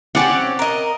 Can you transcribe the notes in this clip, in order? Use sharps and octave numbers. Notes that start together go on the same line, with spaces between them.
C4 C#4 G4 D5 F#5
A#4 D#5